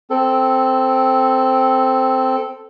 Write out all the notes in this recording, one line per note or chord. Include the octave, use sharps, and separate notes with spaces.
C4 A4